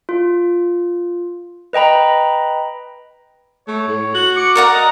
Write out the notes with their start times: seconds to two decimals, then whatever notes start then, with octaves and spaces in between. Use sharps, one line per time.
0.09 F4
1.73 B4 D#5 G5 A#5 B5
3.68 A3 C#5
3.87 A2
4.15 F#4 F#7
4.36 D6 C#7
4.55 A#4 D5 F#5 A#5
4.74 D#5